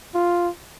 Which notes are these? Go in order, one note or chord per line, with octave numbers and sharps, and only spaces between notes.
F4